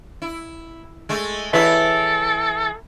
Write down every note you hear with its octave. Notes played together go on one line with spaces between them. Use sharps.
E4
G#3 A3
E3 E4 A4 B4 C#5 E5